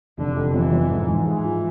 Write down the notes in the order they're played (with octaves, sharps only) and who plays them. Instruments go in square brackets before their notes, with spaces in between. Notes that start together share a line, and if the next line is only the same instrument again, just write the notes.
[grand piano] F1 [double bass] D3
[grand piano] F1
[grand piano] F2 [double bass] E3
[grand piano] F2
G#2
G#2
[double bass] E3 [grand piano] G#3
[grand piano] F3